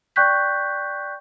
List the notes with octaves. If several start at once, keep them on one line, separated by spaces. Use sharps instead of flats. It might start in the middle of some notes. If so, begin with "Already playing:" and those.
D5 G5 C#6 F#6 G6 B6